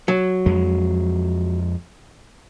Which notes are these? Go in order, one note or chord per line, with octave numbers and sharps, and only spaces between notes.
F#3
F2 G#3